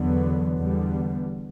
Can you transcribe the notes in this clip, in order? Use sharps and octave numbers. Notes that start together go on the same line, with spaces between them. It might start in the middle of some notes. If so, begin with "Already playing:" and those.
Already playing: E2 D3 F#3 B3
E2 D3 G3 B3